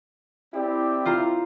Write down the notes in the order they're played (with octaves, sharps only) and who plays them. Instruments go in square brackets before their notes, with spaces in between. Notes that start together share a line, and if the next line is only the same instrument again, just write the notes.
[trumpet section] C4 G4 D5 [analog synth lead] E4
[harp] F4 C5 A#5